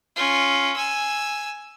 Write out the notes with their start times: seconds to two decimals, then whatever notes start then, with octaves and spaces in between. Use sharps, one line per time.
0.16 C#4 F4
0.76 G#5 E6